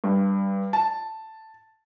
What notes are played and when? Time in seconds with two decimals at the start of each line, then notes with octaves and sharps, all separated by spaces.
0.04 G2
0.73 A5